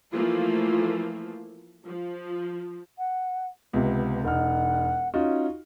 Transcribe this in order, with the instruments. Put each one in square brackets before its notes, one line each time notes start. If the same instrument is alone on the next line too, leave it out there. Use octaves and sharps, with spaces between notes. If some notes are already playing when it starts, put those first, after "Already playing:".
[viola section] E3 F3 A3 A#3 F4
F3
[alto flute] F#5
[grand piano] C#2 C3 [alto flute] B3
[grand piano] E1 D#4 F6 [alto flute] F#5
[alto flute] C#4 [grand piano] D#4 F4 F#4